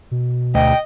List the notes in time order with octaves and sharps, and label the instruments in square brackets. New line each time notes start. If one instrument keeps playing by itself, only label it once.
[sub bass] B2
[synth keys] D2 [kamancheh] D#5 [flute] G5